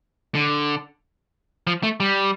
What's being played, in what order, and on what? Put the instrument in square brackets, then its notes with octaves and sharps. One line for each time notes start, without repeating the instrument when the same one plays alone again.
[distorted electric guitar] D3
F3
A3
G3